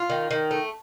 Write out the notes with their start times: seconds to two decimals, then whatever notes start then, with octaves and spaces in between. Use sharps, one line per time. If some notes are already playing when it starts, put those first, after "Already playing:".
Already playing: F4
0.10 D#3
0.31 D#3
0.51 A3